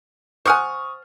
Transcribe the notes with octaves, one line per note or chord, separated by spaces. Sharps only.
C5 F#5 G#5 C#6 D#6 F6